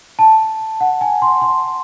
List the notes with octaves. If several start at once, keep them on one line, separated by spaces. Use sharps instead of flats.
A5
F#5
G#5
C6
C6